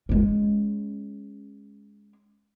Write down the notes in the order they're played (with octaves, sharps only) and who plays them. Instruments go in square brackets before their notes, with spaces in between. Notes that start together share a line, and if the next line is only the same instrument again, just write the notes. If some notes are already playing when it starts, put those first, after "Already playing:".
[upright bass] G#3 C#4